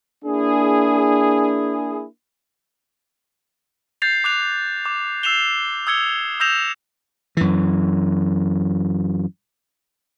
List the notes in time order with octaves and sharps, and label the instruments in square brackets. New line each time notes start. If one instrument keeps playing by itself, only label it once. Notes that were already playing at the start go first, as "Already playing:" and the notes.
[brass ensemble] A#3 D4 E4 G#4
[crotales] G6 A6 C7 F7
D6 F#6 F7
D6
E6 C7 E7 F7 G7
D#6 E6 G#6 C#7 G7
D#6 E6 G6 A#6 E7 F7
[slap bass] F#2 E3